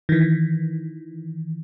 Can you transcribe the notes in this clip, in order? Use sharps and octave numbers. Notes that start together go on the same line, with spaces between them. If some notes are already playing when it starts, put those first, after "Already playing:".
D#3 E3